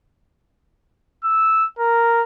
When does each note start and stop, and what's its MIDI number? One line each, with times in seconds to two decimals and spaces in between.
1.24 1.66 88
1.79 2.22 70